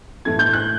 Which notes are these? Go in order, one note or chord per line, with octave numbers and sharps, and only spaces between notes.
A2 E3 A3 G#6
G6
F#6